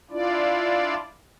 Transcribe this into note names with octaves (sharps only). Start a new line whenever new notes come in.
D4 E4 F4 D5